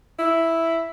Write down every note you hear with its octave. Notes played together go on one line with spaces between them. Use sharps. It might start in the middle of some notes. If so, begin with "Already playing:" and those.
E4